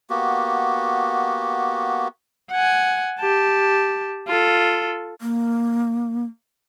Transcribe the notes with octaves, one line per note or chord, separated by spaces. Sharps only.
A#3 B3 F#4 G4
F#5 G#5
G4 A5
F4 A4
A#3